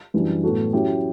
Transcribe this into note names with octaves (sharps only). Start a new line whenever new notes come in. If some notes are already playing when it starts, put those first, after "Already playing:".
F#2 E3 G3 D4
A2 F#3 B3 F#4 A4
F#3 C#4 E4 G4